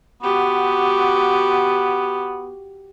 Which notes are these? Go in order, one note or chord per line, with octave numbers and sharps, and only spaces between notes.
B3 F#4 G4